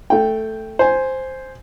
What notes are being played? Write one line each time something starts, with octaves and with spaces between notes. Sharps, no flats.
A3 G5
C5 G#5